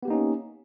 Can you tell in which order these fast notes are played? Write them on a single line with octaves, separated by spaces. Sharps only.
B3 G4 A#3 D#4 C#4